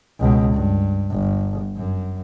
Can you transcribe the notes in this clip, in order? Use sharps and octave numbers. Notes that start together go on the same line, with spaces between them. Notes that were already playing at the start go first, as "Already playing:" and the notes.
C#2 B2
G2
G1
F#2